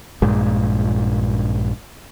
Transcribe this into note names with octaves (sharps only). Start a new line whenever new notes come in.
A#1 G2 A#2 G#3